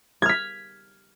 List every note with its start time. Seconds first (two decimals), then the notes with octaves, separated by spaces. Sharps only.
0.22 G#6
0.26 F6
0.29 B6